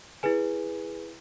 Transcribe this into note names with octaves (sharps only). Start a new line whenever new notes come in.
E4 G#4 B4 G#5